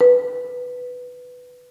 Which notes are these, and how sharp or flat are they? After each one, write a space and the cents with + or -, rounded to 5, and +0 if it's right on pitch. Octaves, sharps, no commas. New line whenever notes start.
B4 +5